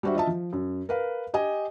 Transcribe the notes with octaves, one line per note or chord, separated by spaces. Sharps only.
G3 D4 F#4 C5 E5
F4 D#5 E5 A5
F3
F#2
A#4 B4 F5
G4 D#5 G#5